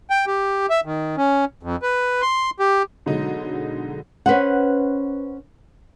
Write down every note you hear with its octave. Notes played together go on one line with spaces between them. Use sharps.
G5
G4
E5
D#3
C#4
F2
B4
C6
G4
B2 D3 F#3 G#3 D#4
C#4 B4 C5 F#5